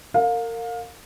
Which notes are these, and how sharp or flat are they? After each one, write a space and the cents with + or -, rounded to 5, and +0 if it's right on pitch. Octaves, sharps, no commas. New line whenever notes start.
A#4 -30 F5 +25